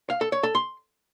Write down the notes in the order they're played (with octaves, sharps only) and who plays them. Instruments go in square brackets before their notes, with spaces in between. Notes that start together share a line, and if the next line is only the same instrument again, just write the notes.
[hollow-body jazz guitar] F5
A4
C#5
A4
C6